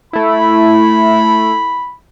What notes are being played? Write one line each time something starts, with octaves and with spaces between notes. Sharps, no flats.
A3 E4 B5